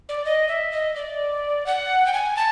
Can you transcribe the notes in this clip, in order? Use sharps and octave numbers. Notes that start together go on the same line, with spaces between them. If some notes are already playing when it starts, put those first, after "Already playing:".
D5
D#5
E5
D#5
D5
F#5
G5
G#5
A5